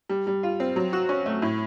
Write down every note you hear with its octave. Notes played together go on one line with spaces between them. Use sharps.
G3
G3
F4
C4
F#3
F#4
C#4
A3
A2